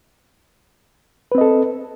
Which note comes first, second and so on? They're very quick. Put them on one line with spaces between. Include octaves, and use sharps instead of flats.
B4 C4 D#5 A4